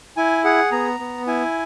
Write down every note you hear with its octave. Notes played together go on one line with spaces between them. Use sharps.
E4 G#5
G#4 F#5
B3 A#5
B3
E4 G#5